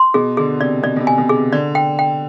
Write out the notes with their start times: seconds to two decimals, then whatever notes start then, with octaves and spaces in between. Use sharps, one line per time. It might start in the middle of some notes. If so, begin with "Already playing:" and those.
Already playing: C6
0.14 B2 G#4
0.37 D3 G#4
0.60 C3 D5
0.83 B2 D5
0.96 B2
1.00 C3
1.07 G#5
1.18 B2
1.29 G#4
1.36 C3
1.52 D3 D5
1.75 G5
1.99 G5